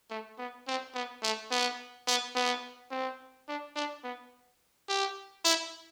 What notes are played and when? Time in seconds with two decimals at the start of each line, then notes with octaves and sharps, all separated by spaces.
0.10 A3
0.39 B3
0.67 C4
0.95 B3
1.23 A3
1.51 B3
2.08 B3
2.36 B3
2.91 C4
3.48 D4
3.76 D4
4.04 B3
4.89 G4
5.45 E4